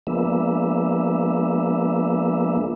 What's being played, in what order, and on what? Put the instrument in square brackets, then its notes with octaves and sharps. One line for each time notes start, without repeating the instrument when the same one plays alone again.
[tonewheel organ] F3 G#3 A#3 B3 D4 E5